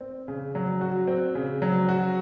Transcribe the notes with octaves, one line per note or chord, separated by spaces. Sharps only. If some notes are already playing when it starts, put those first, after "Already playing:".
C4
C#3
F#3
F#4
C4
C#3
F#3
F#4